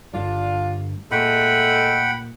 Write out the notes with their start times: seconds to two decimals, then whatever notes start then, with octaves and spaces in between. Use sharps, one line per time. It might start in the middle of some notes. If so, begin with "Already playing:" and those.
0.13 G1 D2 G2 D4 F4
1.11 A#2 G#3 A3 F#5 G5 B5